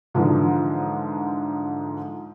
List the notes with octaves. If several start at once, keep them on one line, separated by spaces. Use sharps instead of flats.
G#2 D3 E3 F3